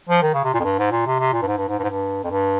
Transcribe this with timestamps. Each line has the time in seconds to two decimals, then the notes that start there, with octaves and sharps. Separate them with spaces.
0.09 F3
0.22 D#3
0.34 C#3
0.44 C3
0.54 A#2
0.60 F2
0.64 G2
0.79 G#2
0.92 A#2
1.07 C3
1.19 C3
1.33 A#2
1.43 G2
1.47 G#2
1.58 G2
1.69 G#2
1.79 G2
1.84 G#2
1.89 G2
2.24 F2
2.30 G2